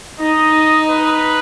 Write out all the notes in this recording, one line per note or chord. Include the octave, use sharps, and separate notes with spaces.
D#4 D#5
B4